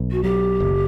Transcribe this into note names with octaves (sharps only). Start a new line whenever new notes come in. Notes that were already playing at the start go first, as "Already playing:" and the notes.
Already playing: B1
F#4
F#3 G4
F#1